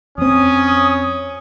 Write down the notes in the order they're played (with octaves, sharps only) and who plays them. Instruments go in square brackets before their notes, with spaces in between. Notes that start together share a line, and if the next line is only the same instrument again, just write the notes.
[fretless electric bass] F2 C4 [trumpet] C#4 [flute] D#6